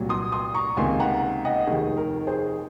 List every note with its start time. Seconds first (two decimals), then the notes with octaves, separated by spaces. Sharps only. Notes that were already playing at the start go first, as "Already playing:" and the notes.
Already playing: C2 A#2 F#3
0.09 C6 D#6
0.32 C6 D#6
0.54 A#5 C#6
0.77 C#2 C3 D#3 A#3 G#5 C6
1.00 F#5 A#5
1.45 D#5 F#5
1.67 F1 D#2 D#3 G#4
1.97 A#4
2.27 G#4 C5